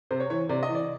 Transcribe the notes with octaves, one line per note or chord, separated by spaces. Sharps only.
C3 C5
C#5
E3 C#5
C3 D5
D#5
E3
D5